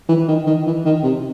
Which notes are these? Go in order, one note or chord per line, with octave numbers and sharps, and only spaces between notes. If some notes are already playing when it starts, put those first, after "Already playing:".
E3
D#3
D#3
E3
D#3
C3